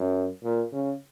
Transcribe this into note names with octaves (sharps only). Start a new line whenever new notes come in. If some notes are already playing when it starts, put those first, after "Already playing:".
Already playing: F#2
A#2
C#3